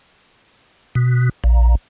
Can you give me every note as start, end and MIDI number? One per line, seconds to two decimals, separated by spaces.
0.95 1.30 47
1.44 1.75 34